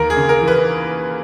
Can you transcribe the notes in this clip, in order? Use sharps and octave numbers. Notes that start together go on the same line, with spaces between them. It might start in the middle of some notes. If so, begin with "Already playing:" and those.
Already playing: D#2 A#4
G#4
C#3
A#4
E3
B4